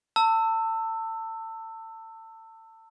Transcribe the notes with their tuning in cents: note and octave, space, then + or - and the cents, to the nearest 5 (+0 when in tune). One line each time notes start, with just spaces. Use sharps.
A5 +35 E6 +0